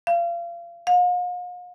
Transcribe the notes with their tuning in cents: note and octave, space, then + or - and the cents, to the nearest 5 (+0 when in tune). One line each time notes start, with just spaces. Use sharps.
F5 -30
F5 +45